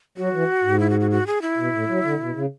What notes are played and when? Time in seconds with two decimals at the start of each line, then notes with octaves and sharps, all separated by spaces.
0.17 F#3 F#4
0.33 E3
0.64 G#2
0.80 E4
0.90 F#4
1.00 F#4
1.11 F#4
1.27 G#4
1.42 E4
1.58 B2
1.73 A2
1.88 F#3
2.04 D3
2.20 B2
2.35 C#3